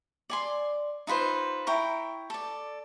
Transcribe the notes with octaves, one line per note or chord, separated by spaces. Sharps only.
D5 G#5 C6
D#4 F4 B4 C5
E4 G5 A#5 C#6
A4 D5